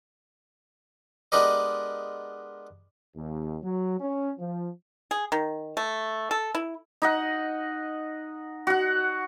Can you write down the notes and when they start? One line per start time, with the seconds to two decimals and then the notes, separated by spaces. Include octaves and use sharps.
1.32 G#3 B3 D4 G4 A#4 D#5
3.16 D#2
3.63 F#3
4.01 C#4
4.39 F3
5.11 G#4
5.32 D#3
5.77 A3
6.31 A4
6.55 E4
7.02 D#4 D#5 F#5
8.67 F#4 F#5